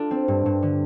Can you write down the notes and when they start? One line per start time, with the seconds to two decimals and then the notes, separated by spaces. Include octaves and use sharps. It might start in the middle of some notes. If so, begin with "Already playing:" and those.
Already playing: D4 F4 A4
0.11 C4
0.28 G2
0.46 G2
0.62 D3